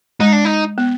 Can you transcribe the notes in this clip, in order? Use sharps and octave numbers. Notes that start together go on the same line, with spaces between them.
G#3 D#4
D4
D#4
B3